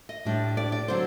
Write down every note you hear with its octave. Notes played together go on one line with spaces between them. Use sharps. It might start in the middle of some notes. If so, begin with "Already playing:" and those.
D#5
A2 G3 D4
D5
D5
D3 F#3 C4 C5